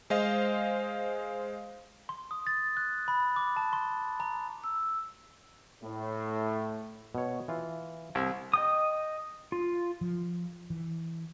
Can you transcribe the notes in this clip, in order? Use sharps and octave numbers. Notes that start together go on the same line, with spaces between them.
G#3 C5 D#5 F5
C6
D#6
A6
F#6
B5
D6
A5
C6
A#5
E6
A2
B2 C#5
E3 F4
C2 A5
D#5 G5 D#6
F4
F3
E3